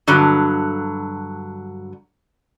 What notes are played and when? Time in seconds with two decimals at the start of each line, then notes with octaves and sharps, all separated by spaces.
0.08 G2 D3 F#3